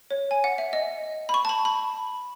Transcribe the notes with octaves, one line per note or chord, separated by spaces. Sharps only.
C#5
G#5
F#5
E5
D#5
B5
C#6
A5
B5
B5